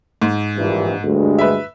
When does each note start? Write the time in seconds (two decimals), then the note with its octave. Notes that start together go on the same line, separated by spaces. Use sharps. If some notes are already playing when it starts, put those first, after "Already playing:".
0.22 G#2
0.56 A#1 G2 E3
1.04 D2 G2 G#3
1.39 B4 E5